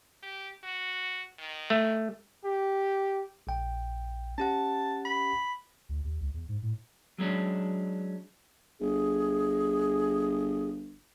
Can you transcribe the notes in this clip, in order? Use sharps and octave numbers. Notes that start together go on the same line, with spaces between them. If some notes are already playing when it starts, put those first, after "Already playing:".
G4
F#4
D#3
A3
G4
A#1 G5
C#4 G4 F#5 A5
B5
D2
D#2
C#2
E2
G#2
A2
F#3 G#3 C#4 D4
G1 G#4